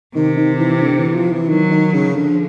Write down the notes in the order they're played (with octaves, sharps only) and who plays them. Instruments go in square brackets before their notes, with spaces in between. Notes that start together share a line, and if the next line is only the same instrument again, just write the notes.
[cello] C3 [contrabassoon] D#3
[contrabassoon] D#3
E3
D3
E3
F3
E3
[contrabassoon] D#3 [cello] F#3
[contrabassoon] D#3
C#3
[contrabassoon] D3 [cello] F3